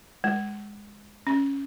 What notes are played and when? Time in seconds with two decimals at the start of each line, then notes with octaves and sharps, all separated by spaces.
0.24 G#3
1.27 C#4